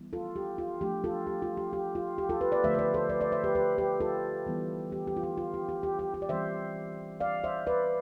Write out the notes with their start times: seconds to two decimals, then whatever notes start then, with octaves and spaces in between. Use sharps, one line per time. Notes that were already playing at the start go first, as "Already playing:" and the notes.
Already playing: E3 G3 B3 E4
0.13 F4 A4
0.36 G4
0.58 F4
0.81 F3 A3 D4 F4 G4
1.04 F4 A4
1.27 G4
1.42 F4
1.57 G4
1.73 G4
1.95 F4
2.18 G4
2.29 F4 A4
2.41 G4 B4
2.52 B4 D5
2.64 D3 F3 A3 C5 E5
2.74 E5
2.79 B4 D5
2.94 A4 C5
3.09 B4 D5
3.21 B4 D5
3.32 C5 E5
3.44 G4 B4
3.55 G4 B4
3.78 G4 B4
4.00 F4 A4
4.46 E3 G3 B3 E4
4.92 G4
5.07 G4
5.17 F4
5.23 G4
5.38 F4
5.54 G4
5.69 G4
5.83 G4
5.99 G4
6.14 G4
6.22 D5
6.29 E3 G3 C4 C5 E5
7.20 D5 F5
7.44 C5 E5
7.67 B4 D5